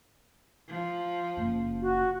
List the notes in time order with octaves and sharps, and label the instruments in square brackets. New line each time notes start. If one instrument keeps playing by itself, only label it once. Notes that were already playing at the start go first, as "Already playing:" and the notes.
[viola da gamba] F3
[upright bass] F#1
[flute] F#4